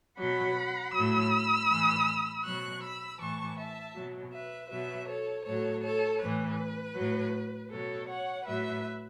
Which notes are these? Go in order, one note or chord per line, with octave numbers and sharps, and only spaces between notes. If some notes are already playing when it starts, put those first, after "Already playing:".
B2 F#3 F#5 B5
A2 F#3 B5 E6
A2 E3
B2 F#3 C#6 F#6
B5 E6
A2 E3 A5 C#6
E5 A5
B2 F#3
B4 E5
B2 F#3 B4 E5
A4 C#5
A2 F#3 A4 C#5
A4 C#5
A2 E3 B4
A2 F#3
B2 F#3 A4 C#5
C#5 F#5
A2 F#3 B4 E5